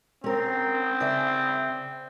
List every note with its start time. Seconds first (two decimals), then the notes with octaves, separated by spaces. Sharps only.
0.24 C4 C#4 A#4
1.00 C#3 D5 E5